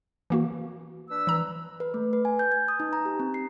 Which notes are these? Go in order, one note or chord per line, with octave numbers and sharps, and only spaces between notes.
E3 A#3 F#4
D4 B4 E6
E3 A#5
B4
A3
B4
G#5
G6
G#6
D#6
D#4
A#5
G4
C4
C7